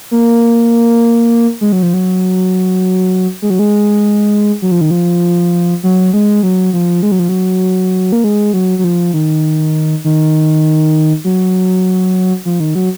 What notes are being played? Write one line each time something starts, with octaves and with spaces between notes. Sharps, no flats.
A#3
G#3
F#3
F3
F#3
G#3
F#3
G#3
F#3
F3
D#3
F3
F#3
G#3
F#3
F3
G#3
F#3
F3
F#3
A#3
G#3
F#3
F#3
F3
D#3
D#3
F#3
F3
D#3
F#3